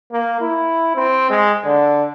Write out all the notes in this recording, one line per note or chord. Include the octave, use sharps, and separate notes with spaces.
A#3
E4
C4
G#3
D3